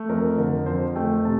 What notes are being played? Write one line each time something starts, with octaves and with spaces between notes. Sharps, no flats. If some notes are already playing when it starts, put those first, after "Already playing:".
Already playing: A3
F2 A#4
D3 A#4
F2 C5
A3 G5
C3 A5